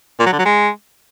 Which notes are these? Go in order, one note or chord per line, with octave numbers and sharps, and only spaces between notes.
A#2
F#3
D3
F#3
G#3